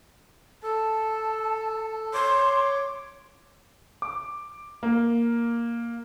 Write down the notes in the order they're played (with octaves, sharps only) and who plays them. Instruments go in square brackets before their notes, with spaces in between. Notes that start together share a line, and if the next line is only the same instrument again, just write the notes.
[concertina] A4 [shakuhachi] A5
[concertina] C#5 D6 [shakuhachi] C6
[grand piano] D6
A#3